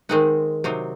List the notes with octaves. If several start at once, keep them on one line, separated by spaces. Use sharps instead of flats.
D#3 G#3 C4 D#4 F#5
C3 F#3 C4 D#4